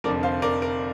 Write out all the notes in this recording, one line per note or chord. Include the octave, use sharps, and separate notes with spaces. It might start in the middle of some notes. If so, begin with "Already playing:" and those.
F1 F2 D3 F3 A#4 D5
C5 F5
A#4 D5
A#4